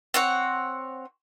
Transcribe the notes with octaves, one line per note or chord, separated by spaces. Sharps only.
C4 C#5 F#5